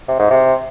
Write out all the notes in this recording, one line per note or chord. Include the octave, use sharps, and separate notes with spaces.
C3
G#2
C3